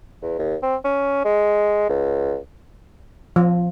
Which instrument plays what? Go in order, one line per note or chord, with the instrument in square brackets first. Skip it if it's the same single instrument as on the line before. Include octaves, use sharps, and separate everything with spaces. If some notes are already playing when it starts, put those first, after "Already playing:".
[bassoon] E2
D#2
C4
C#4
G#3
C#2
[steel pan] F3